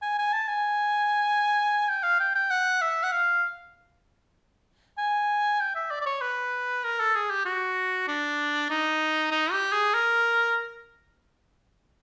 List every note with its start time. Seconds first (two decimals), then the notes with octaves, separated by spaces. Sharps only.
0.02 G#5
0.18 G#5
0.33 A5
0.48 G#5
1.89 G5
2.03 F5
2.20 G5
2.35 G5
2.50 F#5
2.81 E5
3.03 F#5
3.12 F5
4.98 G#5
5.60 G5
5.75 E5
5.91 D5
6.01 D5
6.06 C#5
6.21 B4
6.84 A#4
7.00 A4
7.15 G#4
7.30 G4
7.45 F#4
8.07 D4
8.70 D#4
9.31 D#4
9.52 G4
9.72 G#4
9.94 A#4